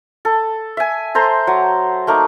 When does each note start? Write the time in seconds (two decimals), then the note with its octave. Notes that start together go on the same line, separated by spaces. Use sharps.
0.25 A4
0.77 E5 G#5
1.15 A4 C5 A#5 C6
1.47 F#3
2.07 A3 A#3 D#4